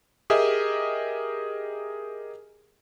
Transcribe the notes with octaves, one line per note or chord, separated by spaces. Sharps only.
G4 G#4 A#4 D#5 E5